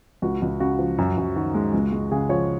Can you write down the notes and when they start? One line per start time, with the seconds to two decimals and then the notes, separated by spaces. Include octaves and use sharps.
0.22 C#2 F#4
0.42 C#2
0.60 C#3 F#4
0.79 F3
0.98 F#2
1.17 F#2
1.36 D#3 F#4
1.54 G#3
1.74 C#2
1.92 G#3
2.11 C#3 G#4
2.29 F3 C#5